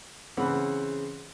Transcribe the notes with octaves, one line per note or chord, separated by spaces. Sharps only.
C#3 E3 C4 B4 F#5 B5